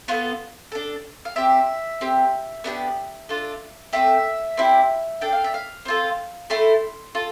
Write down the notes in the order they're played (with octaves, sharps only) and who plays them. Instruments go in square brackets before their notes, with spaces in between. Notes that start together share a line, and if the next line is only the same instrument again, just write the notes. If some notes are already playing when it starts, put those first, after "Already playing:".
[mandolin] B3 F4 A4 C5
D4 A4
F5
C4 G4 E5
C4 G4
B3 D4 G4
D4 F4 A4
A3 C4 G4 E5
C4 E4 G4
D4 A4 G5
F5
E5
F5
C4 F4 A4
A3 E4 A4 C6
F4 A4